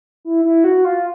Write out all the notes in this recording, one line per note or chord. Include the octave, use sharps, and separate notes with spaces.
E4
E4
F#4
F4